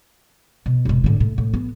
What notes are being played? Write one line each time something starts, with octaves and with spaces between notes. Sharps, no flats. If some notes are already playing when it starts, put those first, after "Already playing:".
B2
E1 B2
A2 D3
A2
A2
B3